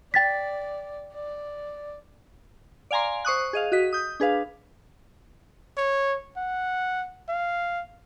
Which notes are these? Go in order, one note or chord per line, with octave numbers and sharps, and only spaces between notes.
D5 G5 A6 B6
D5
D5 F5 G#5 A#5 C6
C5 C#6 D#6 F#6
G#4 D#5 F5
F#4 D#5 B6
D#6 G6
D4 G#4 B4 F5
C#5
F#5
F5